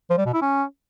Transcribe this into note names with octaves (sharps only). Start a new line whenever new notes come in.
F3
G3
B2
E4
C#4